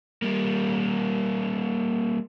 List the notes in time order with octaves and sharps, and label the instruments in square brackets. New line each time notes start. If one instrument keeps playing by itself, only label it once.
[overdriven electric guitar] G3 A#3